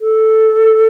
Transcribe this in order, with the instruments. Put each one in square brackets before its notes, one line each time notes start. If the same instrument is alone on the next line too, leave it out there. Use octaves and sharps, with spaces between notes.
[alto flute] A4